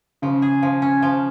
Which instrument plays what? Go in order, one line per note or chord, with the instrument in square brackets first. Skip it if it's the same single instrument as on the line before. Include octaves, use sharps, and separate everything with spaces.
[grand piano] C#3 [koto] F3
[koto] G#4
F3
C#4
F3